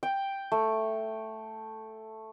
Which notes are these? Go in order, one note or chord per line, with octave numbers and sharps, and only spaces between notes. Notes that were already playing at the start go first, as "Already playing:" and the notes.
G5
A3